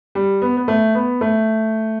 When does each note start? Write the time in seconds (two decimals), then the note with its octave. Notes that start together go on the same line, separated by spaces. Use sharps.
0.15 G3
0.42 B3
0.57 B3
0.68 A3
0.95 B3
1.21 A3